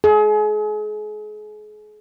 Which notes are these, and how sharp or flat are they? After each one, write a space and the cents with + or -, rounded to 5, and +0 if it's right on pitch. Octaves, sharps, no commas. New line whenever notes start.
G#4 +35